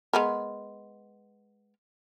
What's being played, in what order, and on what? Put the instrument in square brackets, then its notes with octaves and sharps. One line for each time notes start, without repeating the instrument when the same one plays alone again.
[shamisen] G#3 B3 A#4